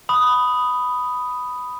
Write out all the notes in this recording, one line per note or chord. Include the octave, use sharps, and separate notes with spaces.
B5 D#6